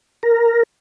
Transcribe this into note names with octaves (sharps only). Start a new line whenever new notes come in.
A#4